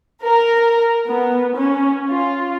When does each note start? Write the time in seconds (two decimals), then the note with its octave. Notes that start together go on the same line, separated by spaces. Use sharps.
0.23 A#4
1.08 B3
1.57 C#4
2.09 F4